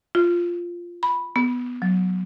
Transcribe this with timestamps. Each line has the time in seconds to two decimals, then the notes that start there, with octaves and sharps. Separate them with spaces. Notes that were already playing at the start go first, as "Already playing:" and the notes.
0.15 F4
1.03 B5
1.36 B3
1.82 F#3